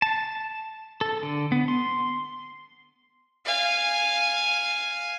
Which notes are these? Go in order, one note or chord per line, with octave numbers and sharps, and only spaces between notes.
A5
A4
D3
B3
C6
F5 G#5